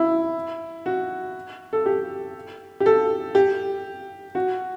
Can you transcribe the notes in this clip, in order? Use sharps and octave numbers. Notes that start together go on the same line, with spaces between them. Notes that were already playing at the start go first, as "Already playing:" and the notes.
Already playing: E4
F#4
A4
G4
G4
A4
G4
F#4